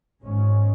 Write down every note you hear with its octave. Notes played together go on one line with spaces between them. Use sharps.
G#1 G#2 G#3 C#4